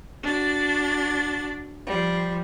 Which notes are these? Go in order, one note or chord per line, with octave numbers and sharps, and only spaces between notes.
D4 F#4 A6
F3 G3